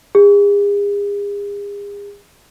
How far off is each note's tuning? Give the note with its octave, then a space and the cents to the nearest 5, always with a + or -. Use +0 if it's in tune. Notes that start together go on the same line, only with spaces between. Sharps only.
G#4 -40